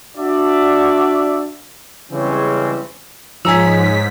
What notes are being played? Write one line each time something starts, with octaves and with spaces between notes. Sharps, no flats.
D4 F#4 D5 E5
C#3 E3 G3 G#3 C4 C#4
G#2 F3 D#4 C#5 G#5 A#5 E6 B6